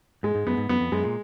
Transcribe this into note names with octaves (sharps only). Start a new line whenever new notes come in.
G#2 G#3
G#2
F#2 B3
G#2
F#2 B3
F2
F#2 G#3
A#2